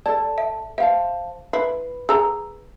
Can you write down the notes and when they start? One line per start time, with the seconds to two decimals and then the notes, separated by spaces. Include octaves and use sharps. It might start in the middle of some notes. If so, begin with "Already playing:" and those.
0.06 A4 D5 A5
0.38 E5
0.78 C5 E5 F5 A5
1.53 E4 B4 C7
2.09 G#4 A#5 E6